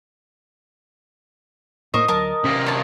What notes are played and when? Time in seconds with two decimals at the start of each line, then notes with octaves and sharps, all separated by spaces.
1.94 A2 A#3 A#4 C5 D#5 C#6
2.08 D2 F#3 A#4 A5
2.44 C3 A#3 C#4
2.66 C#5 A5